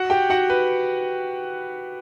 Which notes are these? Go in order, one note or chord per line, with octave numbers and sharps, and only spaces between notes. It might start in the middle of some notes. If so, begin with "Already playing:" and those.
Already playing: F#4 F#5
G4 G5
F#4 F#5
B4